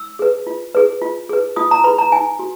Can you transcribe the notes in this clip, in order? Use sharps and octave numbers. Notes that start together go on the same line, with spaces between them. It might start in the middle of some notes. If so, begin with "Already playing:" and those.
Already playing: E6
G#4 B4
F4
G#4 B4
F4
G#4 B4
F4 D#6
A#5
G#4 B4 B5
A#5
D#4 G#5
F#4